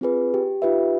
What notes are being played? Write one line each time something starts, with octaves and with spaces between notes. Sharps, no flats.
C4 F4 G#4 B4
G4
D#4 F4 G4 B4 E5